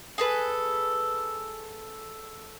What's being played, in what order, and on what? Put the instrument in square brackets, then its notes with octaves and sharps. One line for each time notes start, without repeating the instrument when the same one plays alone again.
[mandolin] G#4 A4 B4